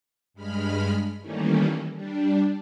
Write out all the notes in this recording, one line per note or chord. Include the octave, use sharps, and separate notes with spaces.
G2 G#3 B5 F6
D#3 E3 G3 A3 A#3 C#4
G3 D4